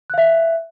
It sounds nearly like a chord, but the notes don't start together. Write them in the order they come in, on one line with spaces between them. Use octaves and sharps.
F#6 F5 E5